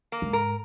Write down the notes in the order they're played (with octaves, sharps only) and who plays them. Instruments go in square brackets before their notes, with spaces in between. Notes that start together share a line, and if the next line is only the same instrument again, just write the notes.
[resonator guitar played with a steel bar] A#3
[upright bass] G#2
[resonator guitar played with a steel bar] A#4